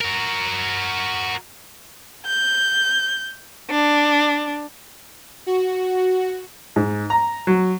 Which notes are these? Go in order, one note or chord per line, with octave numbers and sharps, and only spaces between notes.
F#4 A#4
G6
D4
F#4
G#2
A#5
F#3